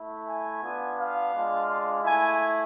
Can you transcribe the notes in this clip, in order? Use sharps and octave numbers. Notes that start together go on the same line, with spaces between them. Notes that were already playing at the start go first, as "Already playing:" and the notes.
Already playing: A3 E4
G#5
B3 D4 F4
F5
G#3 D4 F4
A3 E4 G#5